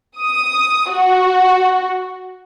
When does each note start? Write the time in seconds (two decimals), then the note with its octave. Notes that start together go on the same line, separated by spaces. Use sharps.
0.20 D#6
0.91 F#4